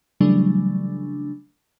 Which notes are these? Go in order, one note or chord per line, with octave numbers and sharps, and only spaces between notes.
C#3 E3 F#3 G3 A3 D4